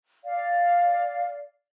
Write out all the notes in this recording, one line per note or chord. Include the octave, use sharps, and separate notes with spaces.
D5 F5